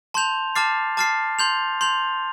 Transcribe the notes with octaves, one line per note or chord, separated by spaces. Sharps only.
A5 C6 G6 F7
A5 D6 F6 A6 C7
A5 D6 F6 A6 C7
C6 G6 F7
C6 G6 F7